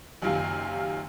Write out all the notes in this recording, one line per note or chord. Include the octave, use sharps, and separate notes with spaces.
F#1 F#2 C3 D#3 F4